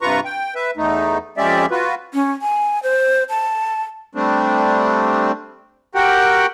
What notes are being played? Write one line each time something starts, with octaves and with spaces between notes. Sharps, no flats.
G2 C3 F4 B4 A#5 C#6
G5
B4 E5
E2 A3 D#4
F2 G#3 C#4 G4 D5 E5
F4 F#4 B4
C#4
G#5
C5
A5
G3 A3 C4 D4
F#4 G4 A#4 F#5 G5